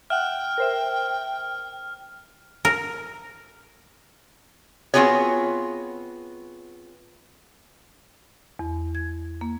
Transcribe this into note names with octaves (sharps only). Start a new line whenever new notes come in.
E5 F#5 G5 F6 F#6
A#4 C5 E5
A#4
B3 C4 F4 F#4 G#4 C#5
E2
G#6
A#3